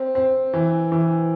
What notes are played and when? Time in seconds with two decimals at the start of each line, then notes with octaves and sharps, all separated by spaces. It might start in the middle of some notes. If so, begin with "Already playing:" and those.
Already playing: C4
0.15 C4
0.54 E3
0.92 E3